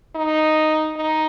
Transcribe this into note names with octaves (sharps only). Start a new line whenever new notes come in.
D#4
D#4